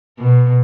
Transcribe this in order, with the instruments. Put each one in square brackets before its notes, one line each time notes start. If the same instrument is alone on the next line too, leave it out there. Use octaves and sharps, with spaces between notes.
[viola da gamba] B2